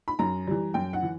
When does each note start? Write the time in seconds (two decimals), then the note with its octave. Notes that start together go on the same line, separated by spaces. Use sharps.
0.08 B5
0.19 F#2 A#5
0.47 E3 G3
0.74 F#2 G5
0.93 F#5
1.03 E3